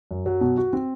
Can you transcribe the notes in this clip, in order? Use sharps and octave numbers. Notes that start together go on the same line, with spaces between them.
F#2
F#3
B2
F#4
C4